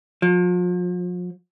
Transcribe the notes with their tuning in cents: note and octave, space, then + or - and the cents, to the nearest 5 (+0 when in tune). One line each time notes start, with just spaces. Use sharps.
F3 +40